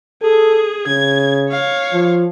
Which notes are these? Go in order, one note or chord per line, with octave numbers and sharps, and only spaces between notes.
G#4 A4
C#3 G#6
C#5 F5
F3